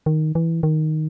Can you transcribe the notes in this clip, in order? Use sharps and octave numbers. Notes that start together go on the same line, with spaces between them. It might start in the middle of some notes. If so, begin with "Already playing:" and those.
D#3
E3
D#3